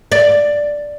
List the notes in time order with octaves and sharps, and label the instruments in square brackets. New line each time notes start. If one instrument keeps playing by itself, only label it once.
[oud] D5